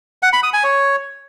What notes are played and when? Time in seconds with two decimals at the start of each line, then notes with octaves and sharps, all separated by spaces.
0.23 F#5
0.33 B5
0.43 D#6
0.53 G#5
0.64 C#5